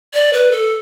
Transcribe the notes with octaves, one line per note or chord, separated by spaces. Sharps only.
D5
B4
A4